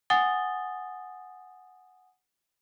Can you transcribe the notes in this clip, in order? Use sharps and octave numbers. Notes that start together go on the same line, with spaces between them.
F#5 G#5 D#6 A6 G7